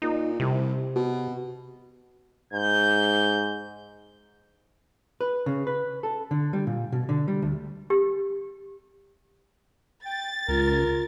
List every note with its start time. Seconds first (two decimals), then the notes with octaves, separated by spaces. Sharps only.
0.02 A#2 D#4
0.40 C2 C3
0.95 B2
2.53 G#2 G6
5.21 B4
5.46 C#3
5.67 B4
6.03 A4
6.31 D3
6.53 G3
6.67 A#2
6.92 B2
7.09 D3
7.28 G3
7.42 D2
7.90 G4
10.05 G5 A6
10.48 C#2 F4 A#4